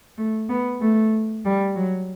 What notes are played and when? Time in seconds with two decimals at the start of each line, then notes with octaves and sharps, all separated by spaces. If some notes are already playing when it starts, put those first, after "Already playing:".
0.18 A3
0.49 B3
0.81 A3
1.45 G3
1.76 F#3